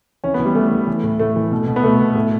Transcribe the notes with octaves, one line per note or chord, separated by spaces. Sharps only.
E3 C#4
B3
E3
G3
E3 A3
E3
E3
A2
A2 A3
E3
B2
B2
B3
B2 A3
B2
A2